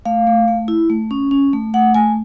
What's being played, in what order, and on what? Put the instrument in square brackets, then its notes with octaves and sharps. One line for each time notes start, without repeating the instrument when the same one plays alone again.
[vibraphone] A3 F5
A3
A3
E4
A3
C#4
C#4
A3
A3 F#5
A3 G#5